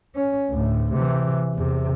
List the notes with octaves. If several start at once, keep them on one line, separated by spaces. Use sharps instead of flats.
C#4
D2 A2
C3 E3
E2 C3